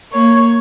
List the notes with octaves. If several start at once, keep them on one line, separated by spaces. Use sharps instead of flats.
A#3 C#5